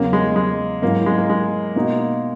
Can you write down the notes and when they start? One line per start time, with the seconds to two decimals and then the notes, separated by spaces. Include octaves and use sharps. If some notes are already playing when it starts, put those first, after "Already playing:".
Already playing: E2 C#3 F#3 A#3 C#4
0.13 G#3
0.36 G#3
0.82 G#2 F#3 A#3 C#4 E4
1.06 G#3
1.18 A#3
1.29 G#3
1.75 B2 A#3 D#4 F#4